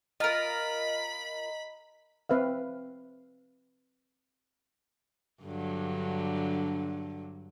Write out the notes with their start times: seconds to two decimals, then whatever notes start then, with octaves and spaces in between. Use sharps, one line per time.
0.20 F4 A#4 D#5 A#5 B5
2.29 C4 B4 E5 F5
5.43 G2 D3 F#3